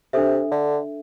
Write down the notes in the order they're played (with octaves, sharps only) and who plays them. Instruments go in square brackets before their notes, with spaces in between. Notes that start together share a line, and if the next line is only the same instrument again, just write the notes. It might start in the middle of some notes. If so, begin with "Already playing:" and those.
[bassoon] C3 [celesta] D4 A4 E5
[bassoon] D3